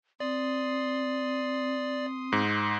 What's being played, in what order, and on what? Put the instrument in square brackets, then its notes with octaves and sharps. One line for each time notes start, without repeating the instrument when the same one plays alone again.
[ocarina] C4 [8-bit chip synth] D5 [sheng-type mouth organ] C6 D#6
[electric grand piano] G#2